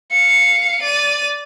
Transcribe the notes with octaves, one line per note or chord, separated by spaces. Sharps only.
F5 C#7
D5 D#7